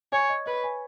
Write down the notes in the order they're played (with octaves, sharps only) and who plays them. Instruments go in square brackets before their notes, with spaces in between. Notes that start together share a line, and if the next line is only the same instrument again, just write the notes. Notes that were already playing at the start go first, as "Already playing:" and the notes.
[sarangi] C#5 [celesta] G#5
[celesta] D#5
[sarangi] B4 [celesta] D#5
[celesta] G#5